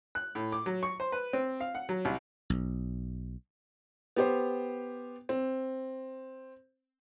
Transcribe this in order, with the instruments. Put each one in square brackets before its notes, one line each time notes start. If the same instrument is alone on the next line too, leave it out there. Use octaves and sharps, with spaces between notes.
[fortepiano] F#6
A2
D6
F#3
C#6
C5
B4
C4
F5
F#5
F#3
C2
[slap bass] B1
[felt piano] B3 G4 C5
C4